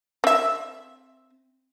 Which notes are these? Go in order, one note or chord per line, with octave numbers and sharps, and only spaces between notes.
C4 E5